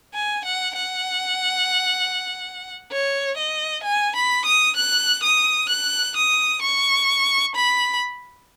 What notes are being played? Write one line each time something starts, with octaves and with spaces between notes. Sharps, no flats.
G#5
F#5
F#5
C#5
D#5
G#5
B5
D#6
F#6
D#6
F#6
D#6
C#6
B5